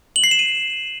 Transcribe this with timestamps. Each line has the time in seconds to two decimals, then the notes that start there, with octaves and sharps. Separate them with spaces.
0.16 F#7
0.24 C7
0.31 E7
0.39 D#7